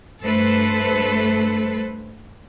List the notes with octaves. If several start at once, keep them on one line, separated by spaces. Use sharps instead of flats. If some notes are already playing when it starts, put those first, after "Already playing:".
G2 A3 A4 B4 C5